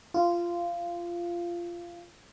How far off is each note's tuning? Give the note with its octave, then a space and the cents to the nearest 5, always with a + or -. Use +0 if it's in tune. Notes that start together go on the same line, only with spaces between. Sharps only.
F4 -15